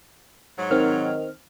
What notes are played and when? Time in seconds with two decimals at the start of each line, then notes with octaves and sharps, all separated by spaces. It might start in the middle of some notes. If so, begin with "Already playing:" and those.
0.58 G#2 F#3
0.71 D#3 C4 D#4 F6